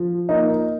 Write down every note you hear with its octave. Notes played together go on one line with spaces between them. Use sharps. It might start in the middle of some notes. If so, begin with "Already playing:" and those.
Already playing: F3
A#3 D#4